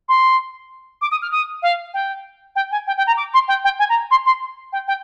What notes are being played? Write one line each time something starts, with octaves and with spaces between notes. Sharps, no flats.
C6
D6
D#6
F6
D#6
F5
G5
G5
G#5
G5
G5
A#5
D6
C6
G5
G5
G#5
A#5
C6
C6
G5
G5